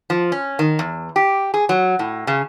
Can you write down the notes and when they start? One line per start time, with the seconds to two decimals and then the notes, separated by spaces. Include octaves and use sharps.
0.10 F3
0.32 C#4
0.59 D#3
0.79 E2
1.16 G4
1.54 G#4
1.69 F#3
1.99 A2
2.27 C#3